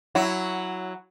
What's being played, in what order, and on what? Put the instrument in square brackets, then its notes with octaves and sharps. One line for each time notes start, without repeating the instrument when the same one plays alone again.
[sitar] F#3 E4